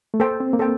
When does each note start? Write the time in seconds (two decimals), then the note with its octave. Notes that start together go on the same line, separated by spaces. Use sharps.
0.14 A3
0.20 A#3 A4 C5 G5
0.40 C4
0.53 A#3
0.59 A4 C5 G5